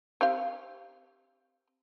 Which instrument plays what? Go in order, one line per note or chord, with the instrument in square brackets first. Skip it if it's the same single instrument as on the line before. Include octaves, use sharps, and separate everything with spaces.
[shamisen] C4 G4 F5